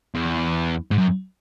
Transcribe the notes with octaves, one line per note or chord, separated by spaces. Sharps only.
E2
G#2
F#2